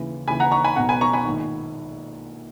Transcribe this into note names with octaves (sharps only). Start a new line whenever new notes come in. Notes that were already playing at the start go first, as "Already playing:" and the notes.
Already playing: D#2 C#3 E3
D#2 C#3 E3 G#5 B5
F#5 A#5
A#5 C#6
G#5 B5
B1 B2 F#5 A#5
G#5 B5
A#5 C#6
G#5 B5
A#1 G#2 D#3